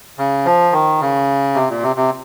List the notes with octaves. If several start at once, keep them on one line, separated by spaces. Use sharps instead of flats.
C#3
F3
D#3
C#3
C3
A#2
C3
C3